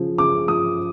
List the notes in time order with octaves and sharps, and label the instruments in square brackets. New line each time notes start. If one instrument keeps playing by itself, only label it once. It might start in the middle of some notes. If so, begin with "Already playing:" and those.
Already playing: [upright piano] C#3 F3
C#3 D6
F3 D#6